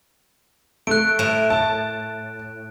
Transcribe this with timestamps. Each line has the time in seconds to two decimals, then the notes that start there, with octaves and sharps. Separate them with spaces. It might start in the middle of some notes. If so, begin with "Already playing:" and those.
0.87 A3 F#6 D7
1.19 A2
1.50 A5